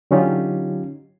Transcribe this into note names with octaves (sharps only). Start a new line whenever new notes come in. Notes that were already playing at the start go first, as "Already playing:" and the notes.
D3 F#3 C#4 D#4 F4 G4